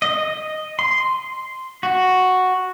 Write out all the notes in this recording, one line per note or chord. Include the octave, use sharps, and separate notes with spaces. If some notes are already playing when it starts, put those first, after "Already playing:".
D#5
C6
F#4